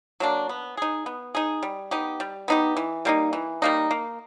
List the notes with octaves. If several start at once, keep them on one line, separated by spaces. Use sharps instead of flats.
F#3 A#3 D4
B3
D#4 G#4
B3
D#4 G#4
G3
B3 D#4 G4
G3
B3 D#4 G4
E3
G3 A#3 D#4
E3
G3 A#3 D#4
A#3